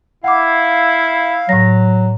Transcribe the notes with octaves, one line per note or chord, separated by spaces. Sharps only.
E4 F5 F#5 D6
A2 F#3 A#6